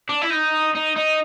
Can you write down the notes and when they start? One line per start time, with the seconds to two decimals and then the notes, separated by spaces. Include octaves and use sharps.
0.09 D4
0.22 E4
0.30 D#4
0.75 D#4
0.96 D#4